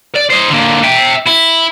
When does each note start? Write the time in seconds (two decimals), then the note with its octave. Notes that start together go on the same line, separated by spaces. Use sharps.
0.15 D5
0.30 C5 D#5
0.49 D3 A#3
0.84 E5 G5
1.27 E4